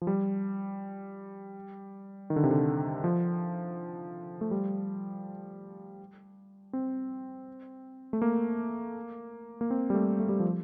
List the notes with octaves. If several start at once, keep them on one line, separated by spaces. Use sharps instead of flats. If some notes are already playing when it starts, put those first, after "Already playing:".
F3
G3
D#3
D3
C3
D3
F3
A3
G3
C4
A3
A#3
A#3
C4
G3
A3
A3
G3
F3